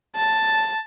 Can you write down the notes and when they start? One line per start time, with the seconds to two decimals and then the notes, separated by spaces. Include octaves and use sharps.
0.16 A5